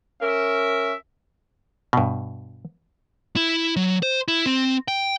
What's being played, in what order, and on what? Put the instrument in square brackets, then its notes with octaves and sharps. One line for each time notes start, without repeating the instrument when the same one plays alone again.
[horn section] C#4 A#4 E5
[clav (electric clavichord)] G2 B2
[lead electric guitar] E4
F#3
C5
E4
C4
G5